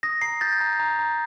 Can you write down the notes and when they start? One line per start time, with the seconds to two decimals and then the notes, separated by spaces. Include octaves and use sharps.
0.03 D#6 A#6
0.21 A#5 C7
0.41 G6 A6
0.61 A#5
0.79 A#5
0.99 A#5